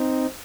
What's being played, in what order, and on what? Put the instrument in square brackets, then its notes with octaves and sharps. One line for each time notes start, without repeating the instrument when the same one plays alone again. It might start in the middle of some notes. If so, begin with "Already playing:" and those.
Already playing: [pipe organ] C4 D#4